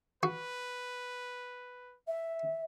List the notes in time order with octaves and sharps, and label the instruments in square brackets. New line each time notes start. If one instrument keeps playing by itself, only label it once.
[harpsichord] F#4 [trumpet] B4
[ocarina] E5